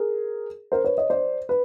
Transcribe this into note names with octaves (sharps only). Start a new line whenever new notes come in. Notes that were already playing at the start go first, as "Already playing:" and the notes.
Already playing: G#4 A#4
A#4 C5
B4 C#5
C#5 D#5
C5 D5
B4